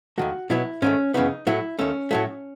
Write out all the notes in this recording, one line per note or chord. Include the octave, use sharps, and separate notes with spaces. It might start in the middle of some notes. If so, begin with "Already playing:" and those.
D#2 D#3 A3 F#4
B2 F#3 B3 E4
G#2 D#3 A3 C#4
F#2 C#3 E3 B3 D#4
A2 F#3 A3 E4
D#2 D#3 A3 C#4
A2 F#3 A3